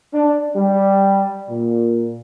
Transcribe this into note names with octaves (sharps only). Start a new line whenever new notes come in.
D4
G3
A#2